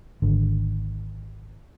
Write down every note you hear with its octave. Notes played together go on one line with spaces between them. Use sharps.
G#1 D3